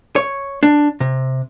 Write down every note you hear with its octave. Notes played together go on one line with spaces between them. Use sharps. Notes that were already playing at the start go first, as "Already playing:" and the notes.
C#5
D4
C3